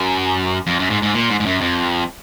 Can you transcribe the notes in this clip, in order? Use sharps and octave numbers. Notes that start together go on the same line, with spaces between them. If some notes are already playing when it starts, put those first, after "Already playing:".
Already playing: F#2
F2
F#2
G#2
G#2
A#2
G#2
G#2
F#2
F2